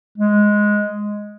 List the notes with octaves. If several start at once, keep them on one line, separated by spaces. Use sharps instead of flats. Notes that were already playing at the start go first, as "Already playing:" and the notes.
G#3